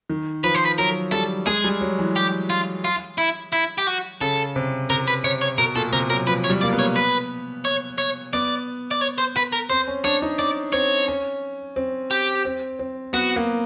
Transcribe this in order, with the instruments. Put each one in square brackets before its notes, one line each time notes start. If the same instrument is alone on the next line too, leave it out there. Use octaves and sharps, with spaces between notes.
[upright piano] D#3
[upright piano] F3 [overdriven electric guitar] B4
[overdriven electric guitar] C5
B4
[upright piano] F#3 [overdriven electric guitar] A#4
[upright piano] G3 [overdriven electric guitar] A4
[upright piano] G#3 [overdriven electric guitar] G#4
[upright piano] G3
F#3
E3
[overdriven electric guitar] G4
F4
F4
E4
E4
G4
F#4
[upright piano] C#3 [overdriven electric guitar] A4
[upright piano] C3
[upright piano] C3 [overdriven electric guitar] A#4
[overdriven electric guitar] B4
[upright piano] C3 [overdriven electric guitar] C#5
[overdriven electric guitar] C#5
[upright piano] B2 [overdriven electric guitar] A#4
[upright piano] A#2 [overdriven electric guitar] A4
[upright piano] C3 [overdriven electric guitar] A#4
[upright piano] F#3 [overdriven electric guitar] A#4
[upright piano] F3 [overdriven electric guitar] B4
[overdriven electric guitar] C#5
[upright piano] G3
[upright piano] A#3 [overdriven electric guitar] D5
[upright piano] B3
[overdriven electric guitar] C#5
B4
C#5
C#5
[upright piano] B3 [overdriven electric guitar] D5
[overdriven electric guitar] D5
C#5
C5
B4
A#4
[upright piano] C4 [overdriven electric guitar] C5
[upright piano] C#4
[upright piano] D4 [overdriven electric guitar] C#5
[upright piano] D#4
[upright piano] C#4 [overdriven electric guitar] D5
[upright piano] C4 [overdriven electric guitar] C#5
[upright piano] C#4
C4
[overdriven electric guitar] G4
[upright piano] C4
C4
[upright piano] B3 [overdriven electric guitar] F#4
[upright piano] A#3